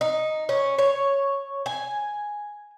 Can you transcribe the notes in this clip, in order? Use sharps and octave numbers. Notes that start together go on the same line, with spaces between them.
D#4
C#4
C#5
G#5